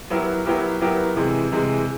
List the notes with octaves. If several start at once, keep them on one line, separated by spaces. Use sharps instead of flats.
F#3 B3 E4 G4 A#4
F#3 B3 E4 G4 A#4
F#3 B3 E4 G4 A#4
C3 E3 G#3
C3 E3 G#3